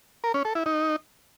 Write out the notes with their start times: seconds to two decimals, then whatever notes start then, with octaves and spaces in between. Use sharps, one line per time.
0.24 A#4
0.34 C#4
0.45 A4
0.55 E4
0.66 D#4